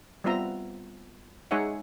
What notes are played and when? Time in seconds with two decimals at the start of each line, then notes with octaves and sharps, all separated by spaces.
0.24 G3 B3 C4 F4 E5 A#5
1.51 G#3 D#4 G#4 C#5 E5 F#5